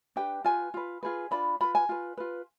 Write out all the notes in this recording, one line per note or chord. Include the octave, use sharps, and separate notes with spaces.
D4 G4 B4 G5
F4 B4 G#5
F4 B4
F4 G#4 B4
D4 F4 B4 B5
F4 B4 B5
G#5
F4 B4
F4 B4